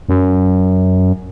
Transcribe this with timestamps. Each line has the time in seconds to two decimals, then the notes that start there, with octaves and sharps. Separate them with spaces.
0.09 F#2